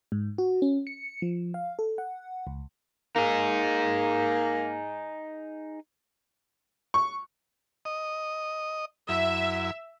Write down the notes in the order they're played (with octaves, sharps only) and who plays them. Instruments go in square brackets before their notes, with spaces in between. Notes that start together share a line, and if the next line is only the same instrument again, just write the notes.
[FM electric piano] G#2
F#4
C#4
C#7
F3
F5
A4
F#5
C#2
[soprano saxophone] A#3 [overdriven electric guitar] D#4 G#4
[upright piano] C#6
[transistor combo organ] D#5
[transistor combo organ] F#2 E4 [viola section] E5